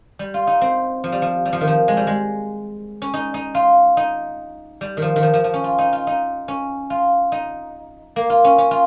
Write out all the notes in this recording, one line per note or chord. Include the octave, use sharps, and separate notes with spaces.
G3
F4
D#4
C4
F3
G3
F3
G3
F3
D#3
F3
G#3
G3
G#3
C#4
D#4
D#4
F4
D#4
G3
D#3
F3
D#3
F3
F3
F3
C#4
F4
D#4
F4
D#4
C#4
F4
D#4
A#3
F4
C#4
C#4
F4